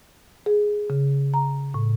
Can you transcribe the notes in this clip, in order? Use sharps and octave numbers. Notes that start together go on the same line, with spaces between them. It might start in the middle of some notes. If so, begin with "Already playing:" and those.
G#4
C#3
A#5
A2